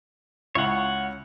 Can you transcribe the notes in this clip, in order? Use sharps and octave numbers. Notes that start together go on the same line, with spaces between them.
C#2 E4 F4 C#5 F#5